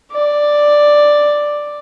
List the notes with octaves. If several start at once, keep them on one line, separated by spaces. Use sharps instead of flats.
D5